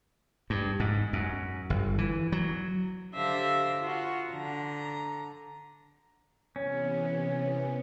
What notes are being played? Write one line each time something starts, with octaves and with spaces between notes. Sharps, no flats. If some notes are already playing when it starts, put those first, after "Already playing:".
G2
G#2
F#2
G1
E3
F#3
D3 G4 C5 E5 F5 A#6
F4 F#4
D3 A#5
C3 E3 B3 C#4